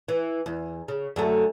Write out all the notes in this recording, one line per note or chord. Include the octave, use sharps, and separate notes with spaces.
E3
E2
C#3
F#2 D3 A3